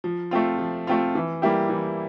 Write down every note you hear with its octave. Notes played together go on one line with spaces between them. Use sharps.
F3
A3 C4 F4
F3
A3 C4 F4
E3
G3 A#3 E4 G4
E3